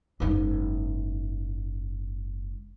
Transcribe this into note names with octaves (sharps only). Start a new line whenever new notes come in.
F#1 G#2